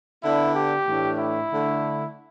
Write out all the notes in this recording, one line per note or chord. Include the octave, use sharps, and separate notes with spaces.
D3 B3 D4 E4
G4
A2 E3 A3 D4
E4
D3 A3 D4